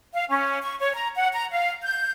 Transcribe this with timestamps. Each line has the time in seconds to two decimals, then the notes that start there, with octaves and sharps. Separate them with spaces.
0.12 F5
0.30 C#4
0.62 C#6
0.79 C#5
0.94 A#5
1.15 F#5
1.33 A#5
1.51 F5
1.83 G6